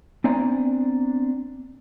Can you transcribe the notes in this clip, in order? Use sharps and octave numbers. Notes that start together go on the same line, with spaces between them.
B3 C4 D4 D5 G#5 A#5